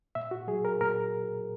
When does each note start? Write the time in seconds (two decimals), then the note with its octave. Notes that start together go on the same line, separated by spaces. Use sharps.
0.15 A#2 E5
0.31 F#4
0.47 F#3 G#4
0.65 A#4
0.81 A#2 A#4